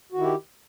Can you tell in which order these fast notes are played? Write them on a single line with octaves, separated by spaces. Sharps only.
F#4 D#3 E4 G4